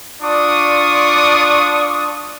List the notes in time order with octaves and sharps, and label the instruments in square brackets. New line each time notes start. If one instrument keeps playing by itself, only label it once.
[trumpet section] D4 F4 D5 C#6 D#6